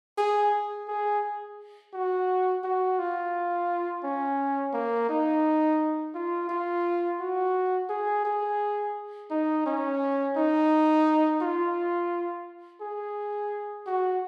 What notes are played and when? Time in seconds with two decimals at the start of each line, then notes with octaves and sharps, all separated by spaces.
0.18 G#4
0.88 G#4
1.93 F#4
2.64 F#4
2.99 F4
4.04 C#4
4.74 A#3
5.09 D#4
6.14 F4
6.49 F4
7.20 F#4
7.90 G#4
8.25 G#4
9.31 D#4
9.66 C#4
10.36 D#4
11.41 F4
12.81 G#4
13.87 F#4